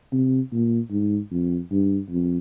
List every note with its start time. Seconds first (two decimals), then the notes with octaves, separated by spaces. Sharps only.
0.13 C3
0.52 A#2
0.91 G#2
1.31 F2
1.72 G2
2.10 F2